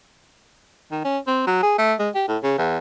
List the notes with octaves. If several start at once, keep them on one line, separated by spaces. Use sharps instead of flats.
D#3
C#4
C4
F#3
G#4
A3
G#3
G4
A2
C#3
E2